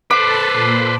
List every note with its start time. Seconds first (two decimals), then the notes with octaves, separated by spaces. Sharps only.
0.11 A4 B4 C5 A5 B5 D6
0.53 A#2